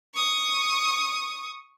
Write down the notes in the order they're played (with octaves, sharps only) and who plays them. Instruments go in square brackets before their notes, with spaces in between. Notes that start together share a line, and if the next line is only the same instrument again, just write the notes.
[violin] C#6 D#6